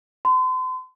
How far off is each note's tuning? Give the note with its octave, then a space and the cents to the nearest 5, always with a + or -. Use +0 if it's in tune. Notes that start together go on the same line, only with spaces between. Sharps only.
C6 -40